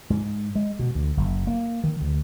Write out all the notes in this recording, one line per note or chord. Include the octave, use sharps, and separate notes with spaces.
G#2
G#3
B2
D2
F#1
A#3
D#3
D2